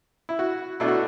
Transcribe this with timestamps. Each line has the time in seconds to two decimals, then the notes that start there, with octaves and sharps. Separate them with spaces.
0.29 E4
0.39 F#4
0.80 B2 A3 D4 E4
0.88 F#4